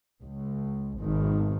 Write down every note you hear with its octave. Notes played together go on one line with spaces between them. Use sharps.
C#2
G#1 B2 D#3